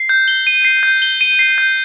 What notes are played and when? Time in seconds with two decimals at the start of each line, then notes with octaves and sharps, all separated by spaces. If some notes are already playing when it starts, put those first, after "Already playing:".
Already playing: C7
0.09 G6
0.28 G7
0.47 D#7
0.65 C7
0.83 G6
1.02 G7
1.21 D#7
1.39 C7
1.58 G6